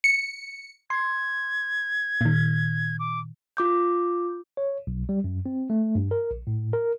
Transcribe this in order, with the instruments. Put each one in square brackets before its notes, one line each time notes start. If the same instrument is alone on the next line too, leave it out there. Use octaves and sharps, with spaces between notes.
[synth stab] C#7
[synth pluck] C6 [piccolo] G#6
[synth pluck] A#2 D#3
[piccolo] D6
[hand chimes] F4 D6 G6
[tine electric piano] C#5
B1
G3
F#2
C4
A3
G2
A#4
A#1
A2
A#4